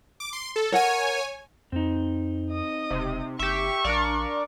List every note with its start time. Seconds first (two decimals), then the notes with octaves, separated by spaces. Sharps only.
0.20 D6
0.33 C6
0.56 A4
0.72 A#4 C#5 F#5 G#5
1.72 F2 C4 D#4
2.53 D#5 D#6
2.91 E1 C3
3.39 F#1 G4 E5 C#6
3.84 A#1 D4 A#4 D5 F5